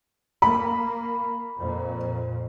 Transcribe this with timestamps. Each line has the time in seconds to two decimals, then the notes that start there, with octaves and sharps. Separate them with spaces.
0.42 A#3 B5
1.57 F2 A#2